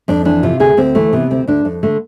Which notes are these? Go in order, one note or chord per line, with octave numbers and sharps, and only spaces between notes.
F2 D4
E3 D4
C3 F4
D2 G#4
D2 C4
E3 A3
C3 B3
D2 C4
D2 D4
F2
D3 A3